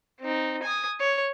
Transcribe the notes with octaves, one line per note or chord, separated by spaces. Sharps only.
C4 D#4
G#5 D#6
C#5